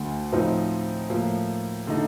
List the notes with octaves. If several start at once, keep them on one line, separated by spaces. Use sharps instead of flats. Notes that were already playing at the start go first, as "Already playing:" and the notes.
Already playing: D2 D3 A3
A2 F3 C4 D#4
A2 F3 A#3
D3 A3 D#4